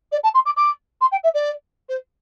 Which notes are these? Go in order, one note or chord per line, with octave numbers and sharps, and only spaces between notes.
D5
A5
C6
D6
D6
C6
G5
E5
D5
C5